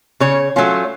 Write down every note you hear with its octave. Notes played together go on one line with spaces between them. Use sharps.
C#3 C#5
F#3 A3 C#4 F4